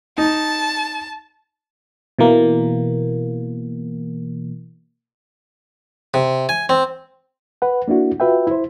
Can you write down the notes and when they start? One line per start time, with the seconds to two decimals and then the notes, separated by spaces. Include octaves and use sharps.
0.18 D#4 A5
2.19 B2 E3 A#3
6.14 C3
6.49 G#5
6.69 C4
7.62 B4 F#5
7.88 A#3 D4 E4 F#4
8.20 F4 F#4 B4 E5 G5
8.47 E4 C5